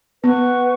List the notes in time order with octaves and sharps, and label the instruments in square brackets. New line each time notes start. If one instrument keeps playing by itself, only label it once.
[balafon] B3 [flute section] B4 F#5 C#6